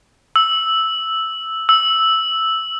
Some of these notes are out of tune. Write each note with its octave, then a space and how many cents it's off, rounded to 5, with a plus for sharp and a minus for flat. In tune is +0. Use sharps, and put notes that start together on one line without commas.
E6 -5
E6 -5